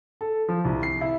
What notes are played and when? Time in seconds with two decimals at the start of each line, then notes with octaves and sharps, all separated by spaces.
0.21 A4
0.48 F3
0.65 C2
0.83 C7
1.01 E4